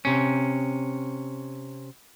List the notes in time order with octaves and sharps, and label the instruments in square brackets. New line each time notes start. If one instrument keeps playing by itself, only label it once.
[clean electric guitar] C3 C#4